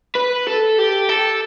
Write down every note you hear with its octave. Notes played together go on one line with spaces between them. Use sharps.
B4
A4
G4
A4